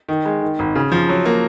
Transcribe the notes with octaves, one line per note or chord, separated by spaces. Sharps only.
D#3
G#3
D#3
G#1
C#3
F3
F#3
A#3